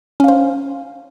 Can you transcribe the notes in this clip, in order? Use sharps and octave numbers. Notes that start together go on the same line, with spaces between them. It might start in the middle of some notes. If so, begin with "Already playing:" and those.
C#4 C5 F5